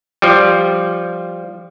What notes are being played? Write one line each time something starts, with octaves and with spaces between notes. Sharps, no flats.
F3 G3